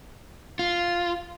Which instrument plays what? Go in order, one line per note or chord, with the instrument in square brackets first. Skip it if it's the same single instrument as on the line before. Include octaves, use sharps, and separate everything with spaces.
[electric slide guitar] F4